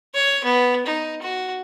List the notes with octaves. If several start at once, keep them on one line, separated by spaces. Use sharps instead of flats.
C#5
B3
D#4
F#4